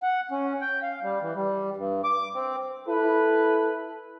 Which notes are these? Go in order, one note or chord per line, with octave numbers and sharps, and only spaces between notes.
F#5
C#4
G5
F5
G3
E3
G3
G2
D6
C4
E4 A4 B4